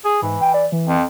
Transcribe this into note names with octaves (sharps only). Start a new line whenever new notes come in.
G#4
G#2 E3
G5
D5
E3
F2